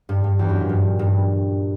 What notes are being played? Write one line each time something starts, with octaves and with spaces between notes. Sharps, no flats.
G2
G2
E2
F#2
A#2
G2
G2